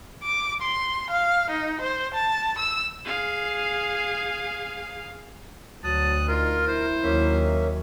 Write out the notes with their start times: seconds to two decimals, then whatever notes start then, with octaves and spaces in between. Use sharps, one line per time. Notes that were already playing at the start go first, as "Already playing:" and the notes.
0.23 D6
0.62 C6
1.10 F5
1.50 D#4
1.80 C5
2.14 A5
2.58 E6
3.05 G#4 F5
5.84 D2 F#3 A5 D#6 F#6
6.28 D#4 F4 A#4
6.68 E4 C5
7.03 D#2 F#3 A#3 C#4 E5